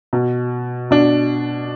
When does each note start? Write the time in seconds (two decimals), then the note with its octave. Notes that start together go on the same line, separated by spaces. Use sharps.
0.13 B2
0.91 B2 D4